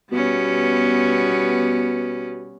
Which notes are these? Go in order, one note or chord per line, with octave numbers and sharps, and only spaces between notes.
B2 G3 B3 C#4